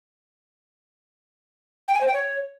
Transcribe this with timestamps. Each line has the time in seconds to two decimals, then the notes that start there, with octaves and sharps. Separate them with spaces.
1.88 G5
1.95 G#5
2.01 C5
2.07 G5
2.14 C#5